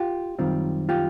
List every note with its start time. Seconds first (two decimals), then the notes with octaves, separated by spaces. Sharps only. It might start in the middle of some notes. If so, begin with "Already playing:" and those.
Already playing: F4 G4
0.39 F#2 D#3 G3 C4 F4
0.89 F4 G4